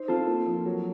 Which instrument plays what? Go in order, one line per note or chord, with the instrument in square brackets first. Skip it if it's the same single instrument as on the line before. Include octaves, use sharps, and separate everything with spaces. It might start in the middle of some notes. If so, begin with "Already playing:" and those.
Already playing: [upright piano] D#4 [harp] C5
[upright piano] C4 [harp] F4 A4
[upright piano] A#3
F3
F#3